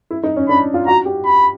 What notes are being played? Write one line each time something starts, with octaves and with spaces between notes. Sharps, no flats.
E4
D#4
C#4
D4 B5
F4
F#4 A#5
G4
B5